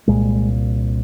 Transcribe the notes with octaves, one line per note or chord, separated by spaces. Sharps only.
C2 A#2 G#3